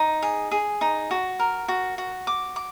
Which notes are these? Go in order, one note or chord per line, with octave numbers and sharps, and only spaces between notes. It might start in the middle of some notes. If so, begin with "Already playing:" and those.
Already playing: D#4
G#4
G#4
D#4
F#4
A#4
F#4
F#4
D6
D6